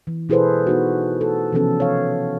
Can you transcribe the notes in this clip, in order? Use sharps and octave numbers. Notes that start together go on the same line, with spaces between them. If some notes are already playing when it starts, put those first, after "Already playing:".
E3
B2 E4 G#4 A4 B4 C5
B3 D#4 F#4
A4
C3 E3 F3 B3 C#4 A4
C#5 F5